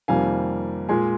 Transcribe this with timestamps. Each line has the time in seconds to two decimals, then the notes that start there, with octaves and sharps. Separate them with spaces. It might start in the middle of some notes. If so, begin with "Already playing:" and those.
0.08 F2 C3 D#3 G3 A#3 F5 G#5
0.89 A#2 G#3 G#5 C6